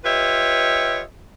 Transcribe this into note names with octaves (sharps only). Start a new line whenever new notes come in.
F4 G4 B4 C#5 D#5 E5